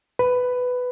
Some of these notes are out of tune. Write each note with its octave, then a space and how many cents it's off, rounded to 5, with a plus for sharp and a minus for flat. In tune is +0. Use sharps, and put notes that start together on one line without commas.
B4 +10